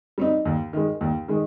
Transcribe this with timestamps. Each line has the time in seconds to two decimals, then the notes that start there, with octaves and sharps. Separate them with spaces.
0.18 G3 C4 D#4
0.45 D#2
0.73 D#3 G#3
1.01 D#2
1.28 D#3 G#3